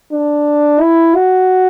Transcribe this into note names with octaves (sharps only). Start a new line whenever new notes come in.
D4
E4
F#4